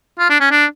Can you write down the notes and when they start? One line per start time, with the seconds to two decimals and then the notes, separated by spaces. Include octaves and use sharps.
0.19 F4
0.30 D4
0.41 C#4
0.51 D4